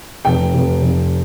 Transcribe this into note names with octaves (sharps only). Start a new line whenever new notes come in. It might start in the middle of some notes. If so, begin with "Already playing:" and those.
F1 G5
F1
F1